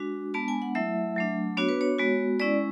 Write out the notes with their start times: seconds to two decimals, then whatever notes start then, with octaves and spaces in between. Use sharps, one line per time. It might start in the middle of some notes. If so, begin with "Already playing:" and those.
Already playing: G#3 D4 F#4
0.34 G#3 B3 D4 A5
0.48 G#5
0.62 F#5
0.75 F#3 A3 E4 E5
1.16 F#3 A3 D4
1.57 B3 D4 F#4 C#5
1.68 B4
1.81 C#5
1.98 G#3 B3 F#4
2.40 G#3 C#4 E4 D5